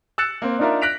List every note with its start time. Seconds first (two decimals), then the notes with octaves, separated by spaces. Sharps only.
0.18 E6 F#6 A6 C#7 E7
0.42 A#3 C4
0.59 D4 D#4 F4 A#4 D5 E5
0.81 F#6 A#6 B6 D7 F7